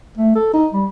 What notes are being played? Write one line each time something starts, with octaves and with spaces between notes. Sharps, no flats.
A3
A4
D#4
G3